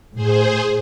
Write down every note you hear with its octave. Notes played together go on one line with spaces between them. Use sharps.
A2 G#4 C5